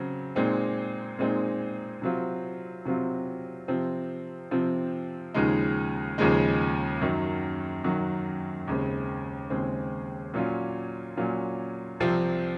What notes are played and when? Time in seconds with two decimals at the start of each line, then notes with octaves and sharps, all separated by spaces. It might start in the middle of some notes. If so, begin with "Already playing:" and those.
Already playing: C#3 F#3 C4
0.36 A#2 G#3 C4 D#4
1.19 A#2 G#3 C4 D#4
2.02 C3 F#3 C4 F4
2.85 C3 F#3 C4 F4
3.68 C3 F3 C4
4.51 C3 F3 C4
5.34 D#2 C#3 F3 G#3 D#4
6.18 D#2 C#3 F3 G#3 D#4
7.01 F#2 D#3 F#3
7.84 F#2 D#3 F#3
8.67 D#2 C#3 G#3 C4
9.50 D#2 C#3 G#3 C4
10.34 A#2 F#3 C#4 F4
11.17 A#2 F#3 C#4 F4
12.00 C2 C3 F3 C4